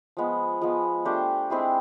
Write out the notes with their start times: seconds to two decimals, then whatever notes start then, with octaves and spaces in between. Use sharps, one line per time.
0.17 F3 G#3 B3
0.62 F3 G#3 B3
1.05 A3 D4 G4 C5
1.50 G#3 C4 E4 G#4